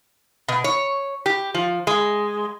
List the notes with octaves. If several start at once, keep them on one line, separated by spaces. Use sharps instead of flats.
B2
C#5
G4
F3
G#3